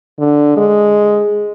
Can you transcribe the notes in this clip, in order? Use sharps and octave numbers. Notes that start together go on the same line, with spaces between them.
D3
G#3